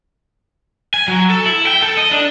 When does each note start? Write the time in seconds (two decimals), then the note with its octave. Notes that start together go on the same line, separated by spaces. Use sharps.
0.94 G#5
1.08 F#3
1.30 A4
1.46 E4
1.67 G5
1.82 A4
1.97 D#5
2.11 D4